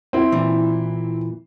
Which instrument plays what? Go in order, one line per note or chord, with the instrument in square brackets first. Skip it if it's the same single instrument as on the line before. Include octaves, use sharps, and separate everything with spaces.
[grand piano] C4 E4
[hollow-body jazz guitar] A#2 E3